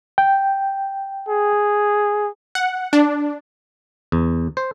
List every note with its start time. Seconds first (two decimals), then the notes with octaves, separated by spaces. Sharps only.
0.18 G5
1.29 G#4
2.55 F#5
2.93 D4
4.12 E2
4.57 C5